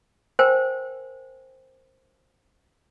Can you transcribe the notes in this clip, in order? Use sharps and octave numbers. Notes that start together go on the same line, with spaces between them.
A#4 C5 G5 G#5